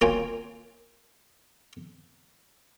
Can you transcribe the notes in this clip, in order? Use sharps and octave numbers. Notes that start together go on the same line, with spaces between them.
A#3 F4 C#5 G5 G#5